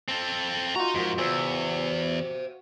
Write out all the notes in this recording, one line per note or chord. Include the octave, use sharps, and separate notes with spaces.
C4 A4
D#4 F4 F#4 A#5
F2 G#2 A#4
E2 C5 E5 E6